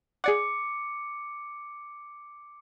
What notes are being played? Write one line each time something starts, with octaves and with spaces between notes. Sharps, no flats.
G#4 D5 F#5 D6 C#7